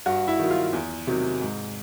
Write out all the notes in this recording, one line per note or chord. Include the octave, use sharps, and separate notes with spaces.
G2 F#4
E4
D#3 F#3
F4
E2
C3 D#3 F#3
G#2